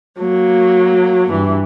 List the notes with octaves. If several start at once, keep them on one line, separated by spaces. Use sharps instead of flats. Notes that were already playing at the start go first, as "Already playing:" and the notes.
F#3 A#3
G2 E3